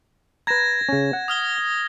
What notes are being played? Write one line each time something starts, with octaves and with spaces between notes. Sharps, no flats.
B4 A#5 G#6 A#6 E7
C#3 C#4
F#5
D#6 F6 G7